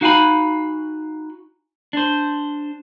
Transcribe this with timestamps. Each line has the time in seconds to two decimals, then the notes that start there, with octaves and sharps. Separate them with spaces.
0.01 D#4 F#4 F5 G5 G#5 B5
1.93 D4 C5